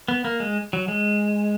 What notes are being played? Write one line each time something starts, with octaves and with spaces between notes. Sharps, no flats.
B3
A#3
G#3
F#3
G#3